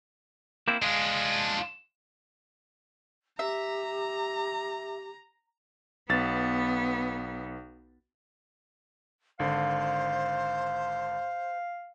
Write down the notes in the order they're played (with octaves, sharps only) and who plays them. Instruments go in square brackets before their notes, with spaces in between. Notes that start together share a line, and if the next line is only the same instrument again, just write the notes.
[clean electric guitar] A#3 C4 E4
[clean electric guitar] G#3 [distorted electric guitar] D4 F4
[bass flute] G4 [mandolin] E5 [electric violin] A#5
[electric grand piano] B1 A6 [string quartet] B3
[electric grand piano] G#1 D3 [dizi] C5 [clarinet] F5